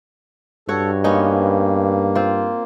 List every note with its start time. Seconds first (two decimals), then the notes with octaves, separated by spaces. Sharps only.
0.69 G2 F#4 A4 C#5
1.04 A#3 B3 C#4 D#4
2.15 C4 F4